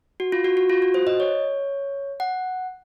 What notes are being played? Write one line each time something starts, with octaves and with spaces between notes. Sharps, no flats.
F#4
F4
F#4
F#4
F4
F#4
C5
D#5
C#5
F#5